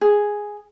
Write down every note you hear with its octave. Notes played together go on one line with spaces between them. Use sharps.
G#4